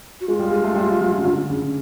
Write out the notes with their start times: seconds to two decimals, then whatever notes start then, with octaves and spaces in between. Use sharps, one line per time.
0.21 F#4
0.27 G#3 F4
0.39 G3
0.51 G#3
0.64 A3
0.76 G3
1.01 F#3
1.18 C#3
1.25 D3
1.50 C#3